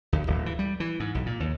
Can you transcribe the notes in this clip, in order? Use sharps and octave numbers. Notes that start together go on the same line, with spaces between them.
D2
D1
E3
G3
E3
G#2
B1
A#2
D#2